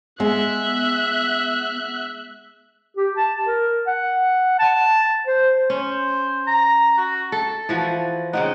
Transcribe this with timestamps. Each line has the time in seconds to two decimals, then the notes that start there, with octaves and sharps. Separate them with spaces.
0.20 G#3 B3 E5 F#6
2.97 G4
3.16 A5
3.47 A#4
3.87 F#5
4.59 A5
5.27 C5
5.70 C#4 C5
6.47 A#5
6.98 F#4
7.32 A4 A5
7.69 E3 F3 F#4
8.33 C#3 C4 D#4 F#5